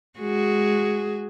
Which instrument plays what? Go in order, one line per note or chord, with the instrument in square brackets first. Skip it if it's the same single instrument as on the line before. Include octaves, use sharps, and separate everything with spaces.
[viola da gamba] G#3 F#4 G#4